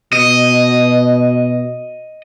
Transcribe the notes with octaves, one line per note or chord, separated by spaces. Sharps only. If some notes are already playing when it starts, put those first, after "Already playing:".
B2 D#5